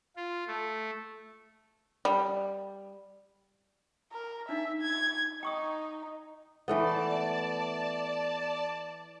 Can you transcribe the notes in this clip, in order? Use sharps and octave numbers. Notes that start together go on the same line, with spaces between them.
F4
A3
G3
A#4
D4 D#4 E5
G#6
D#4 G5 C#6 D#6
E3 A3 B3 D5 A5